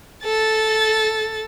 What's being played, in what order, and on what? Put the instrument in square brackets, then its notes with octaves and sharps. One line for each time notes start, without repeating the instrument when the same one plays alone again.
[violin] A4 A6